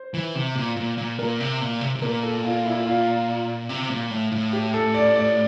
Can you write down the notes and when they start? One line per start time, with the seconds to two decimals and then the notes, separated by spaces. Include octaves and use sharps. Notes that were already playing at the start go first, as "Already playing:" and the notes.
Already playing: C5
0.14 E3
0.35 C3
0.56 A#2
0.76 A#2
0.98 A#2
1.19 A#2 A#4
1.40 C3
1.61 A#2
1.81 C3
1.95 C3
2.02 A#2 A#4
2.23 A4
2.44 F4
2.65 E4
2.86 F4
3.69 C3
3.90 A#2
4.11 A2
4.32 A2
4.53 G4
4.74 A4
4.95 D5
5.16 D5